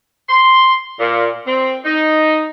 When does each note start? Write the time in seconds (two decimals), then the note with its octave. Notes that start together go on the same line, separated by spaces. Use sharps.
0.29 C6
1.00 A#2
1.45 C4
1.85 D#4